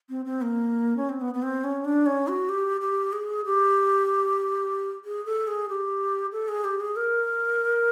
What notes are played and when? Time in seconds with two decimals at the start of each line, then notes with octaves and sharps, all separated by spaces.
0.10 C4
0.25 C4
0.42 A#3
0.97 C#4
1.09 C4
1.21 B3
1.34 B3
1.42 C4
1.64 C#4
1.85 D4
2.06 C#4
2.28 F#4
2.49 G4
2.81 G4
3.13 G#4
3.45 G4
5.05 G#4
5.26 A4
5.47 G#4
5.69 G4
6.32 A4
6.48 G#4
6.64 G4
6.80 G#4
6.96 A#4